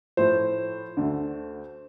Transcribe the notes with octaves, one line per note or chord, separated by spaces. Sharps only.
A2 F3 A3 C5
D2 D3 A3